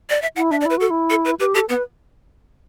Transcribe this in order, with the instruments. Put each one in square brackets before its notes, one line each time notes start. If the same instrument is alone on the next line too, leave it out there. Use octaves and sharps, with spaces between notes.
[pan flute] D5
E5
[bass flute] E4 [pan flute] F#5
[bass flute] D4 [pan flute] E5
[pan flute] D5
[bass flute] E4 [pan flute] B4
[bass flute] F#4 [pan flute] A4
[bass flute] E4
[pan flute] A4
B4
[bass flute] G4 [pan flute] B4
[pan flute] G4 [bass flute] A4
[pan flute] B3 [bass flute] B4